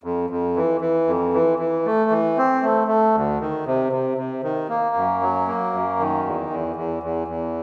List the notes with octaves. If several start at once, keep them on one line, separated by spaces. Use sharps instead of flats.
F2
F2
E3
E3
F2
E3
E3
A3
E3
C4
A3
A3
D2
D#3
C3
C3
C3
D#3
A#3
F#2
F#3
A#3
F#2
D#3
E2
E2
E2
E2
E2